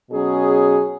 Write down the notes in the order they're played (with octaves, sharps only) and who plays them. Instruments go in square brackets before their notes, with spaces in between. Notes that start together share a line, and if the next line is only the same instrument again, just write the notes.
[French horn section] B2 F#3 C#4 G#4